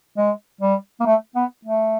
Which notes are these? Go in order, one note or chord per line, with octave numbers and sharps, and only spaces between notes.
G#3
G3
A#3
A3
B3
A3